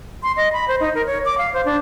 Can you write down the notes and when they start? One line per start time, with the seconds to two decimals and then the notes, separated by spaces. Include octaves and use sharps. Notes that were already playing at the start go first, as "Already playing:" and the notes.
0.23 C6
0.37 D#5
0.53 B5
0.68 C5
0.81 D#4
0.95 A#4
1.06 C#5
1.25 D6
1.38 F5
1.53 C5
1.65 D4